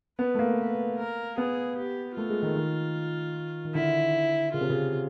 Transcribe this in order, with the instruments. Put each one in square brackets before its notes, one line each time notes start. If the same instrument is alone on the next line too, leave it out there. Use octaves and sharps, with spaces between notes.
[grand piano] B3 [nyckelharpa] B4
[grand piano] A3
A#3
[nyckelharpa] B4
A#4
[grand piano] B3 [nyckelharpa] G#4
[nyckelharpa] G4
[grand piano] A3 [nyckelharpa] F4
[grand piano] G#3
D#3
D#3
D#3
[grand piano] D3 [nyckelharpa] E4
[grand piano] C#3 [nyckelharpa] F4
[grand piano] C3
C#3